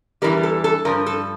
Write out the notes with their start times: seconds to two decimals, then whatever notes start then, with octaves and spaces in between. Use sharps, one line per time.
0.22 E2 E3 G3 A#4
0.43 A4
0.64 A4
0.85 G2 F3 A#4
1.06 A4